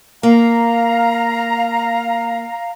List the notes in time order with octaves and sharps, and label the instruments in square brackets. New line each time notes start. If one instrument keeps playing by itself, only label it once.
[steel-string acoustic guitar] A#3 [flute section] F5 A#5